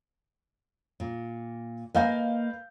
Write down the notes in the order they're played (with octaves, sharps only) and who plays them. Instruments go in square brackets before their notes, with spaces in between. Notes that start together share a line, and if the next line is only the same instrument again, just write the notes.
[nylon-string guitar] A#2
[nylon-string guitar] A#3 D#5 G#5 [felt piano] B4 F5 G6